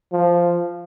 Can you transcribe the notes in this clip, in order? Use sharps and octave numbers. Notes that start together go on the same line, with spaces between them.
F3